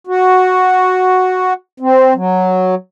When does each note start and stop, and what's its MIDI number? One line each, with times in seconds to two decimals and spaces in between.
0.07 1.53 66
1.80 2.13 60
2.15 2.75 54